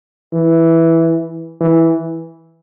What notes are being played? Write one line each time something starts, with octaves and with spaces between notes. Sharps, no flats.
E3
E3